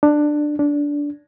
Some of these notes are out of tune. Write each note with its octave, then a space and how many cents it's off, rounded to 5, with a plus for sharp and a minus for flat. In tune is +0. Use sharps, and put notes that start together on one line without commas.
D4 +15
D4 -15